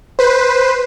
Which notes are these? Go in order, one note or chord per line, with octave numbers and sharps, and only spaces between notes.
B4 C5